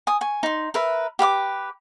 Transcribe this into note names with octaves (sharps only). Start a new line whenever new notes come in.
G#5 D#6
G#5 C#6
D#4 C6
A#4 B4 E5
G4 B4 F#5 D6